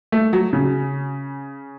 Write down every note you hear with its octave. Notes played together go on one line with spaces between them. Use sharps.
A3
F#3
C#3